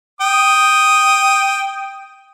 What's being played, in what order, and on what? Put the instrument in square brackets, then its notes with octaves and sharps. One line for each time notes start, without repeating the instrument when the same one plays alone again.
[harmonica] G5 D#6